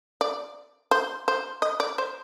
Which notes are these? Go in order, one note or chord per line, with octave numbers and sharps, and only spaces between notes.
D5
C5
C5
D#5
D5
C5